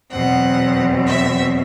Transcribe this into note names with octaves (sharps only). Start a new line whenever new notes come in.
E2 B2 F#3 C4 F#5
E5